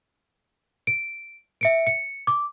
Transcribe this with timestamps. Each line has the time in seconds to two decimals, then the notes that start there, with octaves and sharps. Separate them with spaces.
0.87 D7
1.61 E5 C#7 D7
1.87 C#7
2.27 D6